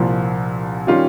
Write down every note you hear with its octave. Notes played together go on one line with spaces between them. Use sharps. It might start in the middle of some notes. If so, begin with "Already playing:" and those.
Already playing: C2 A#2 F3
D#3 G3 C#4 F4